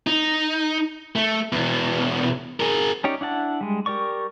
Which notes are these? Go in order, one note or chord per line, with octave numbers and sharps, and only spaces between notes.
D#4
A3
E2 B2
G#4 A#4
C#4 D#4 G4 C#5 D5
D4 E4 F#5 A5
G3 G#3
G4 A#4 D5 C#6